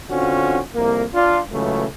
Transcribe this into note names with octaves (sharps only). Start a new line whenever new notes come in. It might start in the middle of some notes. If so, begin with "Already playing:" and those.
D3 C4 C#4 F4 F#4
C2 F2 A#3
D4 F4
C#2 C#3 E3 F#3 A3